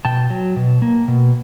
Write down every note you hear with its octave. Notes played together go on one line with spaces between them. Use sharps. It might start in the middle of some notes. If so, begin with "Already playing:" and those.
B2 G5 A5
F#3
B2
A#3
B2